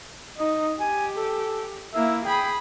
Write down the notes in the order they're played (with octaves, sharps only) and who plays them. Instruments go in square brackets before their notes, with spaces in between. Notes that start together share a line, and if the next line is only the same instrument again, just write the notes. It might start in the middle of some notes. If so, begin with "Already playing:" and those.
[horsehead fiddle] D#4 [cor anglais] D#5
[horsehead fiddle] G4 [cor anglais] G#5
[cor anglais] A4
[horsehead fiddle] A#3 E4 [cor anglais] E5
[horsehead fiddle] G#4 B5 [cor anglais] G5